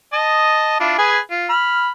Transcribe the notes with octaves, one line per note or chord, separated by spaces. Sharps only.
D#5 A5 D#6
D4 E4 F4
G#4 B4 G#5
F4
B5 F6